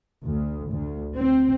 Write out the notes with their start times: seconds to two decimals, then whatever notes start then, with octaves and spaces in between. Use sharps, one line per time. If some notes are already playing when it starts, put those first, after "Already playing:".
0.24 D2
0.72 D2
1.15 C4